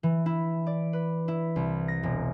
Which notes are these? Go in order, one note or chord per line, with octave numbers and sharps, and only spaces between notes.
E3
E4
D5
B4
E4
C2
A#6
E1